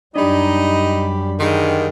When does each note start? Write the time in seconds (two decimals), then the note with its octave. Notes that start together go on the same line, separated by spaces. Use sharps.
0.16 F#2 G3 D4 D#4 G4 D5 D#5 B5
1.40 G2 D3 D#3 G#4